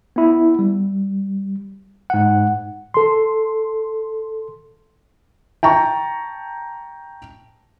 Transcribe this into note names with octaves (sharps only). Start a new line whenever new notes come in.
B3 E4
G3
G#2 F#5
A4 C6
G5 A5 A#5 C#6